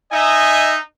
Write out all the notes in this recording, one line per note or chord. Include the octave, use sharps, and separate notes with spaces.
D#4 D#5 E5 G#5